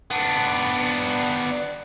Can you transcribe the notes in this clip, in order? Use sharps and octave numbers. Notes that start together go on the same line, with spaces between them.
B3 D4